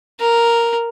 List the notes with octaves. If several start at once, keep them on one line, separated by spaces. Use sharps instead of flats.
A#4